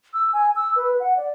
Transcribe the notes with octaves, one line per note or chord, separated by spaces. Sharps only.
E6
G#5
E6
B4
F#5
D5